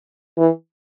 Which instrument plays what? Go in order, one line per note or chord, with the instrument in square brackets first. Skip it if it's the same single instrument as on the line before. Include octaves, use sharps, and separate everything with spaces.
[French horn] E3